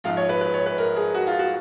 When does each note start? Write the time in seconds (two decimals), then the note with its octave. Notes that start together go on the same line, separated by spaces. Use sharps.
0.04 A#1 G#2 F3 F5
0.17 C#5
0.29 B4
0.41 B4
0.54 C#5
0.66 B4
0.78 A#4
0.96 G#4
1.15 F#4
1.27 F4
1.39 F#4